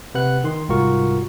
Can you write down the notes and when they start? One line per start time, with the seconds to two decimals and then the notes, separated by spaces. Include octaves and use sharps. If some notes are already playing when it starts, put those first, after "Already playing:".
0.15 C3 B4 F#5 F#6
0.44 D#3 C6
0.69 C2 G#2 F4 F#4 A#4 C#6